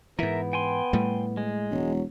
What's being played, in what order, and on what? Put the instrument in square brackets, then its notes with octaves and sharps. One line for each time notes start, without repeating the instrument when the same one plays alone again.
[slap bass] G#2 E3 [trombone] B3 [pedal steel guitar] A#4 E5
[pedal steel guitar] G5 G#5 C6
[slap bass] A2 G3 A3
[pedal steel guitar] G#3
[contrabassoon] E1 [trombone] F#3